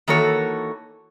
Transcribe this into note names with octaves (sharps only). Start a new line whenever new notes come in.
D#3 E3 A#3 F#4 A4 C#5